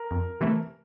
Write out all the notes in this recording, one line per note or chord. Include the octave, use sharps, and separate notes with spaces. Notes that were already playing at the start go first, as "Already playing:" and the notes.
Already playing: A#4
F2
C3 E3 A3